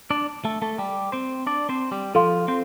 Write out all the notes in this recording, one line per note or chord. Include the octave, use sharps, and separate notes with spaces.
D4 D5
A3 A4
A3 A4
G3 G4
C4 C5
D4 D5
C4 C5
G3 G4
F3 F4 A4 F5 C6
C4 C5